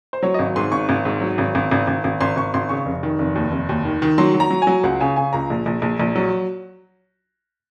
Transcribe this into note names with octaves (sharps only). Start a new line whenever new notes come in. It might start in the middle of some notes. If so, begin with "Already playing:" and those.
C5
F#3 C#5
D#5
G#1 C#5
G#2 C6
G#1 C#6
G#1
G#2
F#3
G#1
G#1
G#1
G#1
G#1
G#1 C6
G#1 C#6
G#1 C6
C#3 C#6
F1
D#3
F1
D#2
F1
D#2
D#3
D#3
F#3 C6
F#3
A#5
F#3
G#5
F#3
C#2 F#5
C#3 G#5
C#3 G#5
C#2 A#5
A#1
A#1
A#1
A#1
F#3